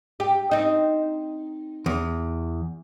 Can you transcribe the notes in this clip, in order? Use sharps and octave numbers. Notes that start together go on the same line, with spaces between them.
G4
C4 D#4
E2